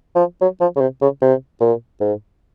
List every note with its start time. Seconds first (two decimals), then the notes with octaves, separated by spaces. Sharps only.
0.16 F3
0.41 F#3
0.61 F3
0.76 C#3
0.81 C3
1.02 C#3
1.22 C3
1.60 A#2
2.01 G#2